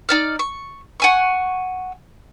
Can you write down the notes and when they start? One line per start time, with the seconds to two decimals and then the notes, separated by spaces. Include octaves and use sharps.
0.09 D#4 D5 F6
0.39 C#6
1.00 F#5 G#5 C#6